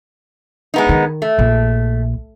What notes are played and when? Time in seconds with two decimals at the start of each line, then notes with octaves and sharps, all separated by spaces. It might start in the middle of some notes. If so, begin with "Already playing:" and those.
0.74 G#3 B3 D#4
0.89 D#3
1.22 A3
1.39 A#1